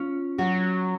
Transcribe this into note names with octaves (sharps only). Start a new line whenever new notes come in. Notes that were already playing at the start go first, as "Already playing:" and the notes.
Already playing: C#4 F4
F#3 F#4